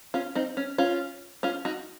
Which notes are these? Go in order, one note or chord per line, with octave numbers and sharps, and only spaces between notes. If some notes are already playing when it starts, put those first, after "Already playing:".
C#4 F4
C4 D#4
C#4
C#4 F4
C#4 F4
D#4 F#4